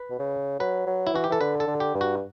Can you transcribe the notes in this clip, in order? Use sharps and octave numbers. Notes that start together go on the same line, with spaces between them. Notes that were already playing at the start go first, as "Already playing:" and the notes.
Already playing: B4
B2
C#3
F#3 B4
F#3
E4
E3 F#4
G4
E3 A4
D3 B4
A4
D3
G4
G2
F#4